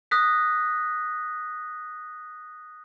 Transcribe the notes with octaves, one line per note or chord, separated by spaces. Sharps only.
D#6 F#6 A#6 B6